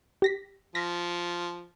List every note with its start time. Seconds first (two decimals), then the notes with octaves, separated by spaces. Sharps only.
0.22 G4 A#6 B6
0.75 F3 A#6 B6